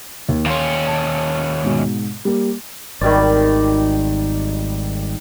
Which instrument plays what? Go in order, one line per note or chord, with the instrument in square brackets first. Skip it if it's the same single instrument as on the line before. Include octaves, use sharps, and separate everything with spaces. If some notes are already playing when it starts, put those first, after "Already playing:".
[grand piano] D#2
[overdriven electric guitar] D#2 C#4 [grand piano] F5 C6
[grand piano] A5
G#2 B2
G3 A#3
[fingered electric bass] G#1 [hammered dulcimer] D#3 G3 D5